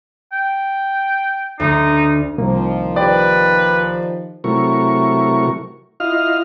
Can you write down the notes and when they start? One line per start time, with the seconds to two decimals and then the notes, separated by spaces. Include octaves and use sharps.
0.32 G5
1.60 D2 D#4
2.38 C2 D#3 F3 A#3
2.96 G4 B4 D5
4.44 C3 F#3 A3 E4 A#4 C#6
6.00 E4 F4 D#5 F5 F6